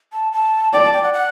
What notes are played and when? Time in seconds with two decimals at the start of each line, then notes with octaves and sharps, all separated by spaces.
0.13 A5
0.32 A5
0.73 D5 G5
0.83 A5
0.93 G5
1.03 F#5
1.14 F#5